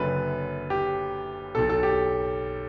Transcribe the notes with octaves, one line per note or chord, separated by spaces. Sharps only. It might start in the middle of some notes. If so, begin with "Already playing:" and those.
Already playing: F#1 F#2 D3 B4
G4
B1 B2 A4
A4
G4